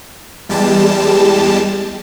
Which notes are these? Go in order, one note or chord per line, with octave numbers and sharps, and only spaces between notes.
E2 G3 G#3 G4 A5